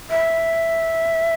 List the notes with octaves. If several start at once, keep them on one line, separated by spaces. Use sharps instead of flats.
E5